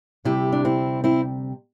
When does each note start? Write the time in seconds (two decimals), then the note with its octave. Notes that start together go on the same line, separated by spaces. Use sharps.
0.25 D2 C3 G3 E4 G4
0.53 D4
0.65 C4 E4
1.04 C4 E4